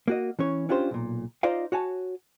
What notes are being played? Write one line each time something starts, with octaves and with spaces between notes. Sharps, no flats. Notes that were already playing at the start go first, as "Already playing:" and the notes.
A#3 F#4 D#5
E3 C#4 C#5
C#4 D4 F4 G4 C5
B1 A#2
D#4 F4 C5 D5 D#5 F5
F#4 C#5 G#5 A5